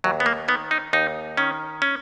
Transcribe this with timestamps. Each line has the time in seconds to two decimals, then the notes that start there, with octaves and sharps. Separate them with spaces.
0.04 D#2 F#3
0.20 B3
0.26 A#3
0.48 D#3 B3
0.71 D#4
0.93 D#2 D#4
1.37 D#3 C#4
1.82 C#4